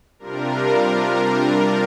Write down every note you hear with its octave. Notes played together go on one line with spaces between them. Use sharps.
C3 G3 D4 F4 A#4